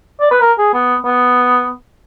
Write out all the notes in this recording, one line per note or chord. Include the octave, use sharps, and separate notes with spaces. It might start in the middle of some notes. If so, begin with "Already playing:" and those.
D5
B4
A#4
G#4
B3
B3